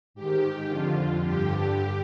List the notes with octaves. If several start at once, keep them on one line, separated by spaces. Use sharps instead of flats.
G#2 D#3 G4
F2 D3 F4
G2 D3 G4